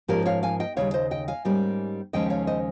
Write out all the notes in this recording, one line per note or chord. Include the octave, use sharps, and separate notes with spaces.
G#2 F3 A#3 C#4 G4 A#4
C#5 F5
F5 G#5
D#5 G5
D#2 C#3 G3 C#5 F5
C5 D#5
D#5 G5
F5 G#5
G#2 G3 A#3 C#4
D#2 C#3 F3 G#3 C#4 D#5 G5
C#5 F5
C5 D#5